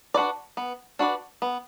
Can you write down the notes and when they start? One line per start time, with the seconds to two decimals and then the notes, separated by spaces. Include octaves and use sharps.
0.14 D4 F#4 B4 D5
0.57 B3
0.99 D4 F#4 B4 D5
1.42 B3